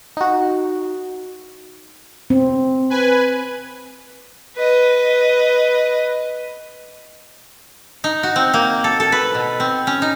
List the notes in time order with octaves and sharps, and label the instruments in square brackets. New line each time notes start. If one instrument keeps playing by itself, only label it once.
[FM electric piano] D#4 F#4
[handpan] C4
[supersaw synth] B4 G#5
[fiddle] B4 D#5
[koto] D#4
F#4
C4
A#3
A4
A4
B4
B2
C4
C#4
D#4